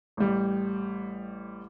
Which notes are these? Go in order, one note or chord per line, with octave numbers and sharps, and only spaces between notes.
A1 G3